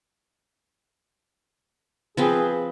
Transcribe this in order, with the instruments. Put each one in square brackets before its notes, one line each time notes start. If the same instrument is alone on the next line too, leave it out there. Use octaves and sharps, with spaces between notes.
[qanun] F3 C4 B4 [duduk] G#4